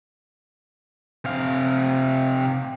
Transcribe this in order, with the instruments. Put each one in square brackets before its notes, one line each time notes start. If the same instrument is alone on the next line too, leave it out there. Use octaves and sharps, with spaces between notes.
[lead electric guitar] C3 F5